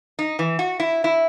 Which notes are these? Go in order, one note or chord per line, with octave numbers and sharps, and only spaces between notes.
D#4
E3
F#4
E4
E4